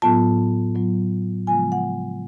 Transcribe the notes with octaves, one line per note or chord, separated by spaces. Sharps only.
A2 F#3 B3 F4 A5
A2 F#3 B3 F4
C#3 F3 G#3 B3 F4 G#5
F#5